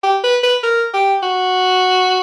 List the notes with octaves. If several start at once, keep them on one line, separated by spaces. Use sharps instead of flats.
G4
B4
B4
A#4
G4
F#4